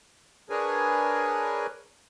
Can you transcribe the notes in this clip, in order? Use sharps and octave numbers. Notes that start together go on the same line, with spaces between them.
D4 G#4 A#4 B4 C#5 G#5